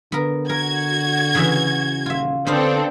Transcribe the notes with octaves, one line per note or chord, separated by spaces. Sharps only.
D3 B3 A#4
F#4 A#4 G#6
C#3 E3 E5
D#1 F4 E5
D3 B3 C4 D4 A4 C5 F5